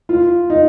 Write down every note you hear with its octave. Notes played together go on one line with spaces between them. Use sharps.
F4
D#4